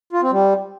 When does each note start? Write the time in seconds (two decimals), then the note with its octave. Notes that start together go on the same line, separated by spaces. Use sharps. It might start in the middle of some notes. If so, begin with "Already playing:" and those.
0.13 F4
0.22 C4
0.31 G3